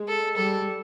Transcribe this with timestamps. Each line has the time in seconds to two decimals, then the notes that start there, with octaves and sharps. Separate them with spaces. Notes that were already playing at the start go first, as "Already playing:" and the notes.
Already playing: G#3
0.08 A4
0.37 G3 A4